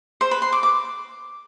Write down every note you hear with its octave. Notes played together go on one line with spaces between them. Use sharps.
C5
B4
C6
D6
D6